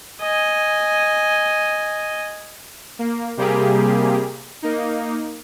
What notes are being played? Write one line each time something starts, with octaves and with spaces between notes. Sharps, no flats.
D#5 G#5
A#3
C3 G3 A#3 G4 G#4
A#3 D#4